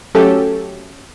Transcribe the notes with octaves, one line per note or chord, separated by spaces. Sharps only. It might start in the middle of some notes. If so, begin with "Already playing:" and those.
F#3 A3 C#4 G4 A4